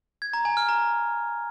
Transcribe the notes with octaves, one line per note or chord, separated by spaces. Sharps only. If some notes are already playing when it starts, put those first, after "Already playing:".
G#6
A#5
G#5
F6
A#5